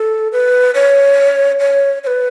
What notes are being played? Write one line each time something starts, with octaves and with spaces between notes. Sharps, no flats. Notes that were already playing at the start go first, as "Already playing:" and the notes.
Already playing: A4
B4
C#5
C#5
C#5
B4